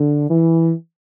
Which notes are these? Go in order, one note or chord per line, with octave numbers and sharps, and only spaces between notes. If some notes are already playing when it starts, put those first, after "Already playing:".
Already playing: D3
E3